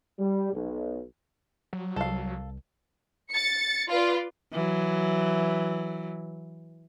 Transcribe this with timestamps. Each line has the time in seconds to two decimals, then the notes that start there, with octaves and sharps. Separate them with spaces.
0.19 G3
0.53 B1
1.73 F#3
1.96 C2 A4 F5
3.31 A6 C#7
3.91 F4 B4 D5
4.53 E3 F#3